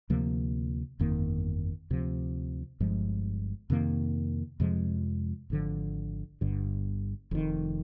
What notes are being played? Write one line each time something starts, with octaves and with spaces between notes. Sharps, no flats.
D2 C3 F3 A#3
G1 F2 D#3 A#3
D2 C3 F3
G1 G2 F3 G#3
F2 C3 D#3 A#3
F2 C3 F3 G#3
G#1 G2 D3 F3
G1 G2 D3
F1 F2 D#3